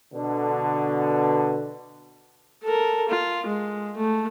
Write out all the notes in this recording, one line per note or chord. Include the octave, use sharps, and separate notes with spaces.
B2 D3
A4 A#4
F4
G#3
A3